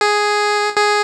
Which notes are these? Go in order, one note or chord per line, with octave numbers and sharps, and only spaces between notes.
G#4
G#4